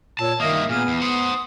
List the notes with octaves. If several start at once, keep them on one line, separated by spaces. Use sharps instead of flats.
A#2 C#5 A5 E6
G2 D#3 A#3 D#5 E5 D#6
A#2 B3 G#4 G#5 F6
E2
C5 F#5 D#6